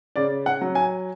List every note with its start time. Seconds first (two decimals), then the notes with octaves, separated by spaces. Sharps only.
0.16 C#3 D5
0.46 F#5
0.61 F#3
0.75 G#5